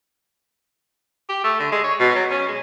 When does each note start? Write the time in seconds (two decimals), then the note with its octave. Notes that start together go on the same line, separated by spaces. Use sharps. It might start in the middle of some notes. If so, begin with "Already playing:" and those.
1.29 G4
1.44 A3
1.60 D3
1.72 G#3
1.84 C#5
2.00 B2
2.15 F#3
2.31 C#4
2.48 G#3